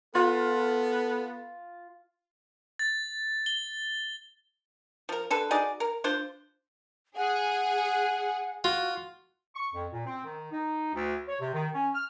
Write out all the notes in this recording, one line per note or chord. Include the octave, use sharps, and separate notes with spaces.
B3 F4 A4
A6
G7
F3 A#4
D3 A4 B4
D#4 F#4 G#4 D5
A#4
D4 F4 C5
G#4 F#5
F4 F#4
C#6
F2
A#2
C4
D#3
D#4
D2
C#5
C3
D#3
C#4
F6